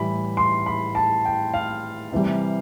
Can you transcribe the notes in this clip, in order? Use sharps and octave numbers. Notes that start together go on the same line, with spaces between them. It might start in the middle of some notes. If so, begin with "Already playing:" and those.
Already playing: A2 E3 G3 B5
C6
B5
A5
G5
F5
C3 E3 G3